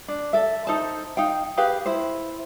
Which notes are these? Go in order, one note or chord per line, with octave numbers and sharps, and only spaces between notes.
D4
A4 E5
D#4 A4 C5 A5
D#4 F5 G5
G4 G#4 B4 F5
E4 C5